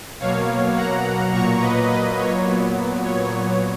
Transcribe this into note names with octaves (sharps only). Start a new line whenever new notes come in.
B2 F#3 A#3 C#5 F5
F#5 A#5
A#2 F#3 A#3 A#5 C#6
B4 D#5
B4 D#5
C#5
A#2 F#3 B3
C#5